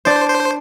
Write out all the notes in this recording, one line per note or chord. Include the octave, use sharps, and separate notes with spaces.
D4 C5 D5
C5